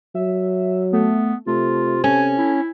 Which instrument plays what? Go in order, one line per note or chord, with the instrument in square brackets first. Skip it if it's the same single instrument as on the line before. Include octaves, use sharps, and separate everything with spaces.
[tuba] F#3 [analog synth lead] E5
[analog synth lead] A3 [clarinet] B3
[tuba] C3 [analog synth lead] A3 [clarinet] F4
[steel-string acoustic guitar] C#4 [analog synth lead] A4 [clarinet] G#5
[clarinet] E4